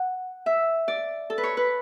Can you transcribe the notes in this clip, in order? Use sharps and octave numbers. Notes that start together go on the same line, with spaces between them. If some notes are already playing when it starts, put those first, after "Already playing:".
Already playing: F#5
E5
D5
A4
B4
C#5
B4